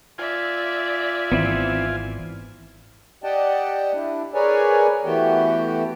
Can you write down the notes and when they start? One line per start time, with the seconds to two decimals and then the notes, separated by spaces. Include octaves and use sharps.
0.18 F4 D5 E5 G#5
1.32 G#1 E3 B3 C4 E4
3.24 G4 D5 D#5 F#5 G5 A5
3.94 D4 E4
4.34 G#4 A#4 B4 C#5 D5 G#5
5.05 E3 A3 B3 F#4 G4 G5